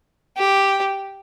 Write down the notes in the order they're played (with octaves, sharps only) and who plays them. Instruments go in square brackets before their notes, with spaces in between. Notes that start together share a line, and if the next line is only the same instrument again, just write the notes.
[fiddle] G4